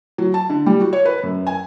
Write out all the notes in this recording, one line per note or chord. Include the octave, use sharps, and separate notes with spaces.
F#3
A5
D3
G3
F#4
C#5
B4
F#2
G#5